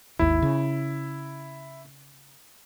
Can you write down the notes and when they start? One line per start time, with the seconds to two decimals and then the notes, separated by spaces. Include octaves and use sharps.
0.19 G#1 D#2 E4
0.42 C#3